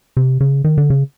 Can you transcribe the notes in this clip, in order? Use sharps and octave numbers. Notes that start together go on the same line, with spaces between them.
C3
C#3
D#3
D3
C#3